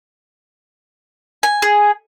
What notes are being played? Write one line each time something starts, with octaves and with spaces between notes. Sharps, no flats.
G#5
G#4